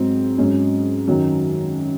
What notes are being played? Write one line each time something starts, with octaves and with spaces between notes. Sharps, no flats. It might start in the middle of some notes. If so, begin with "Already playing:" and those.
Already playing: G#2 F#3 C4
G#2 F#3 C#4
F#2 D#3 F#3